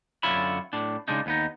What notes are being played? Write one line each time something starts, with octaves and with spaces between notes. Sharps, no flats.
F#2 D3 F4 C#5 E5 B5
A2 D4
C#3 G#3 D4 D#4
D#2 B3 D#4